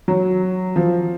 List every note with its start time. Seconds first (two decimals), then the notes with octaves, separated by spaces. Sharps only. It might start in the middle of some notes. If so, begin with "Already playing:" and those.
0.08 F#3
0.76 F3